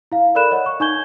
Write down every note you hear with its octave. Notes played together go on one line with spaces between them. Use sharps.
E4 F5
A4 A#4 D5 B5 F#6 E7
C#5 D#5 F#5
C#6
D#4 G#5 C#6 G6 G#6 G7